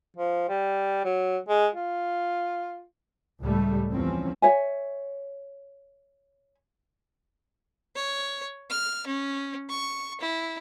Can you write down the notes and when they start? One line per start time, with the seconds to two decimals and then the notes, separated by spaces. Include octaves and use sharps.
0.17 F3
0.49 G3
1.05 F#3
1.48 G#3
1.75 F4
3.41 C#2 A2 G3 A3
3.91 E2 F3 C4 C#4
4.42 C#5 E5 G#5
7.96 C#5
8.70 F6
9.07 C#4
9.69 C#6
10.21 E4